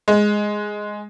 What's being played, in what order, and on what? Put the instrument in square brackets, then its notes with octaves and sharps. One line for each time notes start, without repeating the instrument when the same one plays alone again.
[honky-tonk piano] G#3